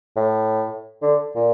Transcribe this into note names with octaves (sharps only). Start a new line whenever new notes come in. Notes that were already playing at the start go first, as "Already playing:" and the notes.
A2
D3
A#2